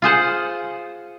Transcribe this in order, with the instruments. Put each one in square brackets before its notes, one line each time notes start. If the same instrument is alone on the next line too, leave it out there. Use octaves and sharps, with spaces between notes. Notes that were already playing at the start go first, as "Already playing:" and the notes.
[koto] F4 G#4 C5 F#5